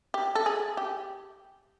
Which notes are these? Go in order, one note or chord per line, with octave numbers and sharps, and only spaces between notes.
G4
A4
G#4
G4